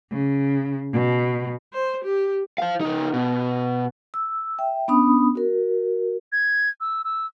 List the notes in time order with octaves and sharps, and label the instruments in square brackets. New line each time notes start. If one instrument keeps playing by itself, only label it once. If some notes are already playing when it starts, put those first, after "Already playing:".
[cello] C#3
B2
[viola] C5
G4
[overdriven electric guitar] C5 F5
C#3 D#4
B2
[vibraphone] E6
E5 G5
B3 C#4 D4 B5 D#6
F#4 A#4
[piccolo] G#6
E6
E6